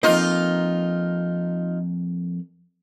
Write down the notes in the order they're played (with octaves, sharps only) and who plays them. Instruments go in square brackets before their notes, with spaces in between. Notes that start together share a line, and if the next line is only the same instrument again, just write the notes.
[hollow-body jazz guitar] F2 A#3 [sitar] D#4 F4